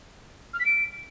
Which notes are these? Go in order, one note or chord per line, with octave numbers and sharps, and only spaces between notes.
F6
B6
D7